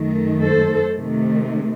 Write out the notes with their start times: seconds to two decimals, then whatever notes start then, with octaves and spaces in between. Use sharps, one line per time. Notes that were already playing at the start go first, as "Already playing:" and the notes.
Already playing: F#2 D#3 A3
0.39 A4 C5
0.94 C3 D#3 A3